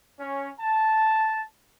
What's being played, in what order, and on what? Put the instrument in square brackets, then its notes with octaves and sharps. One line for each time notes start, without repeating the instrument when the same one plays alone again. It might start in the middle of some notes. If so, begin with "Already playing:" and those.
[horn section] C#4
A5